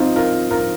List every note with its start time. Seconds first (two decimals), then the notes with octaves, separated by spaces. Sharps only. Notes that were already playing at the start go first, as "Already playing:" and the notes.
Already playing: C4 D#4 F4
0.16 F4 A#4
0.51 F4 A#4